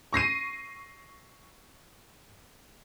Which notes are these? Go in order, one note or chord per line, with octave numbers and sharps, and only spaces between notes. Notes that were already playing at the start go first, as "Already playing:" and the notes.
C#6 A#6 C7 D#7